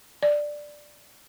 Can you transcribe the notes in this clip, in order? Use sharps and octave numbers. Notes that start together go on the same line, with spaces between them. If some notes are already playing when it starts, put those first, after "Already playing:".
D5